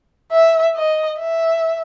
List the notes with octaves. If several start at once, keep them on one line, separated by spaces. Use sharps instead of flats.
E5
D#5
E5